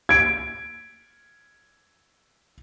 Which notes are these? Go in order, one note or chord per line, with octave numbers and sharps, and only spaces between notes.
G#6 D7